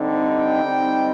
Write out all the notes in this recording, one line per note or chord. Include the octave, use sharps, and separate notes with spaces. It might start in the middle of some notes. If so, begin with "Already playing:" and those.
Already playing: D3 G3 C4 D#4
G5
D3 G3 C4 D#4